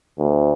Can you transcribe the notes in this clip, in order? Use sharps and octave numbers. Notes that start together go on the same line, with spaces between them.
D2